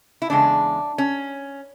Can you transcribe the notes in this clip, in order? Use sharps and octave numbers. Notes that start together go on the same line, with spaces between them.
E4
E2 C#3 G#3 D4
C#4